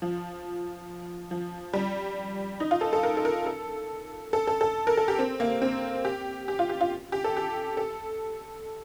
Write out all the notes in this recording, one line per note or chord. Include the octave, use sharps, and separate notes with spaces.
F3
F3
G3
D#4
F4
A4
A4
A#4
A4
A#4
A4
A4
A4
A4
A#4
A4
G4
C4
A#3
C4
G4
G4
F4
G4
F4
G4
A4
G4
A4